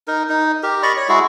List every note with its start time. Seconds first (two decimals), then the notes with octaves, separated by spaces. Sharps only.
0.07 D#4 A#4
0.29 D#4
0.63 G4 A#4
0.83 D5 D#5 B5 C#6
0.97 C#5
1.09 G#3 E4 F#4 G#4